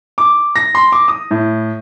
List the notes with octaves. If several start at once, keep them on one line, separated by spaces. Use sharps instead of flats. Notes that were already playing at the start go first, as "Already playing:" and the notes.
D6
A#6
C6
D6
D#6
A2